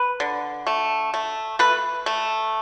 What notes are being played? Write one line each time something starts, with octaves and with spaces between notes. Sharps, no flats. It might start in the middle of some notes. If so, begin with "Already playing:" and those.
Already playing: B4
D3
A3
A3
A3 B4
A3